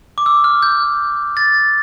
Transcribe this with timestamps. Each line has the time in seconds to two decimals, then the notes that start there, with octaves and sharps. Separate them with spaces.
0.18 D6
0.26 E6
0.44 F6
0.63 G6
1.37 A6